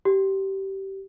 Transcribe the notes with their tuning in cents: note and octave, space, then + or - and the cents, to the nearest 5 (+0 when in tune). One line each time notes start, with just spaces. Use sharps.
G4 -20